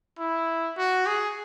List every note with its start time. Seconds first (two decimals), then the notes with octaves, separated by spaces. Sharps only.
0.19 E4
0.77 F#4
1.06 G#4